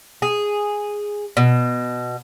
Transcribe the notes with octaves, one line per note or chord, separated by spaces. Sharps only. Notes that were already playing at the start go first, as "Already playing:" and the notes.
G#4
B2